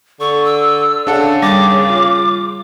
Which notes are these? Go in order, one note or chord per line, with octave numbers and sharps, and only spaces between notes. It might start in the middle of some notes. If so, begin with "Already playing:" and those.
D3 C#6
E6
C#3 D4 A4 F#5 A5
D#2 G3 D6 A6
F4